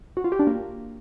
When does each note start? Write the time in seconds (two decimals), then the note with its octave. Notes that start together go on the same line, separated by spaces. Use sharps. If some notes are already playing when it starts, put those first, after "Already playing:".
0.17 F#4
0.24 F4
0.32 G4
0.39 D4
0.47 A#3